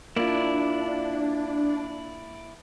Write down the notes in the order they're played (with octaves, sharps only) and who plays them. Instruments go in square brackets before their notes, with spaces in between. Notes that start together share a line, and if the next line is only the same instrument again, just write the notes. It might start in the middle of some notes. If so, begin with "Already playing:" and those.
[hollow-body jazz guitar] A#3 F4 [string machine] D4 [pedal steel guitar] E4 D5